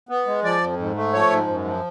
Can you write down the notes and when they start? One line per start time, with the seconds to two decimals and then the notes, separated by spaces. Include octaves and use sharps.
0.09 B3
0.26 G#3
0.43 F3 D5
0.61 F2
0.79 G#2
0.96 A3
1.13 F3 C#5
1.30 G#2
1.47 F#2
1.65 F3